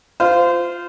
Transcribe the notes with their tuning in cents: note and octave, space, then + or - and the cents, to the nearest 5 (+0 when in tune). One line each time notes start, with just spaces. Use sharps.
F4 +0 C5 -20